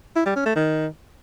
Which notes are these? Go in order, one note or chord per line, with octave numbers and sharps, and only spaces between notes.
E4
G3
C#4
A3
D#3